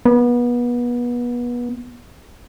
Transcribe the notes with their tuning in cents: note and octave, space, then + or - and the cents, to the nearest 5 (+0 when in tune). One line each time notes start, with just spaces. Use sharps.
B3 -30